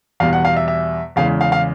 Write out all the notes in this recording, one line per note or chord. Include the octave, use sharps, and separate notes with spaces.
E2 B2 G3 F5
F#5
F5
E5
E5
E2 C#3 E3 G#3 F5
F5
F5